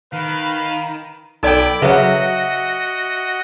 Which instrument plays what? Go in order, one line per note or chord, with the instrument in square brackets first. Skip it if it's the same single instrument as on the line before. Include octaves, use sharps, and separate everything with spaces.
[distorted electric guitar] D#3 [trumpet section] B4 F5 [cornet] B5
[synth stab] B1 G5 [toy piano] D#4 A4 D5 [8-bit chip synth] B5 D6 E6
[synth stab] C#3 F#3 [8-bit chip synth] F#4 D#5 [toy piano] B4 [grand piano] E5 F#5